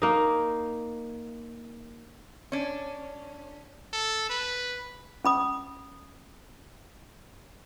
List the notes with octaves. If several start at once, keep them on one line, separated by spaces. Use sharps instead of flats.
A#3 D#4
C#4 D4
A4
B4
C#4 B5 D#6